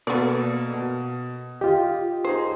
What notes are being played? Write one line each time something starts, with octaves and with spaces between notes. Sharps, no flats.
B2 A#3 B3 A4 D5
B2
F4 G4 D#5
D#4 G#4 C5 C7